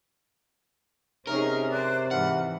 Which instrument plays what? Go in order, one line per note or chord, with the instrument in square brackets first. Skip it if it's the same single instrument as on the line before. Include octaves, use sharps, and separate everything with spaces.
[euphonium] C3 [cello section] C#4 D#4 G#4 [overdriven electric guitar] A#4 [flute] F6
[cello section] C5 D5 [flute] F#6
[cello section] G#2 E3 [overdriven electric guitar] F#5 [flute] F6